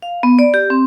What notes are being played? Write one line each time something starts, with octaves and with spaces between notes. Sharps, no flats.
F5
B3
D5
G4
C4